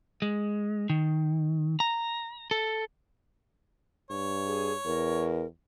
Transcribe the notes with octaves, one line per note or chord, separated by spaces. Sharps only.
G#3
D#3
A#5
A4
G2 C#5
G#4
E2 A#4